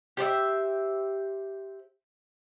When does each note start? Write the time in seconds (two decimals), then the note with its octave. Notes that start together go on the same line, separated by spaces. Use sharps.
0.17 G4 C5 D5 E5